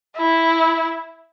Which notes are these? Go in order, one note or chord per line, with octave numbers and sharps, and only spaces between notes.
E4